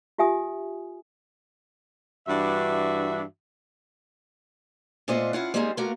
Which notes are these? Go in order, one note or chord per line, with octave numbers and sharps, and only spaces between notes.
F4 G4 E5 G#5 D#6
G2 E3 D4 F#4 E5
A#2 A3 B3 F4 C5 D#5
C#4 E4 F4 F#5
G3 G#3 A#3 C4 D#4 G#4
A3 A#3 F4 F#4 A#4